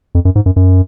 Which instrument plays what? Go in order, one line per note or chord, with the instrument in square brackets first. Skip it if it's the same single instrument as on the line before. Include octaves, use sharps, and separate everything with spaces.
[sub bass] F2
F#2
G#2
F#2
F#2